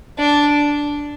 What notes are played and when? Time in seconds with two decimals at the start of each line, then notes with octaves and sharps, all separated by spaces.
0.18 D4